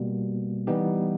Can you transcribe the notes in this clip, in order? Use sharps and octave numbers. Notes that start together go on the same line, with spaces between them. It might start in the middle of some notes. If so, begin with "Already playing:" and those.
Already playing: B2 G3 A#3
E3 G3 B3 D#4 G4